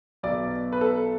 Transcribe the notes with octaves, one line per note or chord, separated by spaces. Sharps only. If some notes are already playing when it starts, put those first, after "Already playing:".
B1 B2 D5
B4
A4